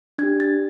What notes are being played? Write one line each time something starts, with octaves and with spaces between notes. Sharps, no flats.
D4 G4 G#6
A6